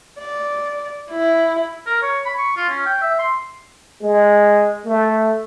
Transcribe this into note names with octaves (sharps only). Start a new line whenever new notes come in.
D5
E4
A#4
C#5
B5
C#6
F4
C#4
G5
E5
C6
G#3
A3